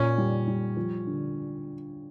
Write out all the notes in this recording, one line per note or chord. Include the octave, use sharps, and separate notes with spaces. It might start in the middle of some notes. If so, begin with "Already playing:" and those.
Already playing: A#2 C#4
G3
G3
F3
D3